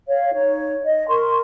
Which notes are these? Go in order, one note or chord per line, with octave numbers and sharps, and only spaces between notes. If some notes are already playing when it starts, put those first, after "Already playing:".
C#5 F5
D#4 C#5
D#5
A#4 C6 C#6